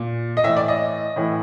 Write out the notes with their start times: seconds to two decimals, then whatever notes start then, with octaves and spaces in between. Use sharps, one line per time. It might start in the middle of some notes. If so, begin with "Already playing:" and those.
Already playing: A#2
0.37 D#5
0.44 A2 E3 E5
0.57 D5
0.68 D#5
1.16 A2 E3